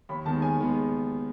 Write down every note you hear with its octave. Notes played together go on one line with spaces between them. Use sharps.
D#2 B5
D#3 G#3 B3 A5
D#2 G#5
D#3 G#3 B3